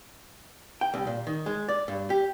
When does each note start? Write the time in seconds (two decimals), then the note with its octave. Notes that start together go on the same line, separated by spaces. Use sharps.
0.81 G5
0.94 C2
1.07 A#2
1.27 D#3
1.46 G#3
1.68 D5
1.88 G2
2.10 G4